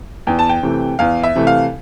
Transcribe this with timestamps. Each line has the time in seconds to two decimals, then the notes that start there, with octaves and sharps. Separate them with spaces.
0.27 E2 G5
0.39 A5
0.49 G5
0.63 C3 E3 A3
0.99 E2 F5
1.23 E5
1.35 C3 E3 A3
1.47 F5